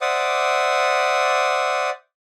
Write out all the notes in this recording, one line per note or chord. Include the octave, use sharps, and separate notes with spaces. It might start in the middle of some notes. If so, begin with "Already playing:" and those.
C5 D5 E5 F#5 D6 D#6